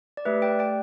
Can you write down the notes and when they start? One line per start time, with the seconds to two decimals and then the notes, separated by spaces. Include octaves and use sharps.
0.17 D5
0.25 A3 G4 B4 E5
0.42 D5 G5
0.59 D5 G5